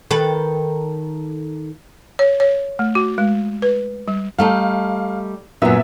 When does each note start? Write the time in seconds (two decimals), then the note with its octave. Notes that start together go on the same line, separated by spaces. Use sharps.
0.11 D#3 A4 B4
2.19 C#5
2.40 C#5
2.79 A3
2.95 F#4
3.18 G#3
3.62 B4
4.08 G3
4.38 G3 A3 D#4 F5
5.62 F#2 A#2 F#3 B3 E5